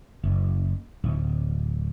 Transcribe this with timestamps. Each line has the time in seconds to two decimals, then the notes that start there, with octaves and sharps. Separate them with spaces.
0.24 F#1
1.04 D1